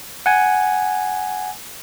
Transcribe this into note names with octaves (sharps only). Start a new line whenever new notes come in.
F#5 G#5